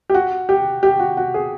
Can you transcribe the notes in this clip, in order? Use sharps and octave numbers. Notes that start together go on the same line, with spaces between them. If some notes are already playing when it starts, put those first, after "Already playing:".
G4
F#4
G4
G4
F#4
F#4
G#4